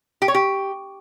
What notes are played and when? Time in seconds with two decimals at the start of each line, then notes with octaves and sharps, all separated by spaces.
0.22 G4
0.28 C#5
0.35 G4